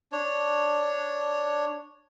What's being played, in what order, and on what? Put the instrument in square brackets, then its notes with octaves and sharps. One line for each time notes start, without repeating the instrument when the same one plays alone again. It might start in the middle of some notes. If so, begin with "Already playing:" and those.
[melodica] D4 C#5